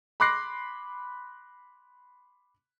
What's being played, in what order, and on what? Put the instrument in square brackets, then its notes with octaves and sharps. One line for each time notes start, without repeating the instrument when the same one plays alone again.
[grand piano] B5 C6 D6 F#6 A#6 C7